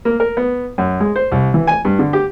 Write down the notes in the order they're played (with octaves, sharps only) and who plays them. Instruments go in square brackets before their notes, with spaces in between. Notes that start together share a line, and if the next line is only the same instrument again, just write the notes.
[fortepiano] A#3
A#4
B3
F#2
G#3
C5
C2
E3
G#5
G2
D3
G4